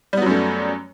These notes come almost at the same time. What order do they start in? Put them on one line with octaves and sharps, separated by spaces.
G3 B3 F#3 F#2 A3